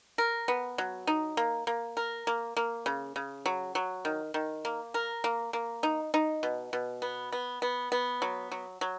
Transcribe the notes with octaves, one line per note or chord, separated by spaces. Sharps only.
A#4
B3
F#3
D#4
A#3
A#3
A#4
A#3
A#3
C#3
C#3
F#3
F#3
D#3
D#3
A#3
A#4
A#3
A#3
D#4
D#4
B2
B2
B3
B3
B3
B3
F#3
F#3
F#3